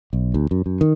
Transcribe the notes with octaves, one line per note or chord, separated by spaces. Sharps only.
B1
D2
F#2
F#2
D#3